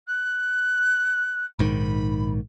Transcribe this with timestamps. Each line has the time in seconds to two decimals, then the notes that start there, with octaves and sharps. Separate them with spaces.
0.08 F#6
1.59 A#1 G#2 D#3 B5